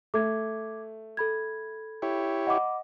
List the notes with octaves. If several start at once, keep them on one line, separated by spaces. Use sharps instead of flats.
A3 D6 G#6
A4 B5 G#6
E4 G4 C#5
D#5 F#5 B5 D6